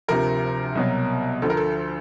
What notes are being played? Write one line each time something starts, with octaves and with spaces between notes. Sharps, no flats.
D2 C3 F3 A#4
C2 B2 F#3
D2 D3 F3 A4
A#4
A4